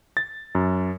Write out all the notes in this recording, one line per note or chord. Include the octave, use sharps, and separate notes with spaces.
A6
F#2